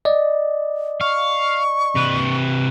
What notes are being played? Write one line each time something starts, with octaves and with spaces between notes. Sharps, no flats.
D5 D#5
F5 C#6
C3 B4